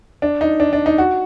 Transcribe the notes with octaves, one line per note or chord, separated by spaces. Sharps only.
D4
D#4
D4
D4
D#4
F#4